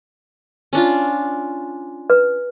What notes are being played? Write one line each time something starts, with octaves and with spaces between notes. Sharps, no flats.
C#4 D4 F4
B4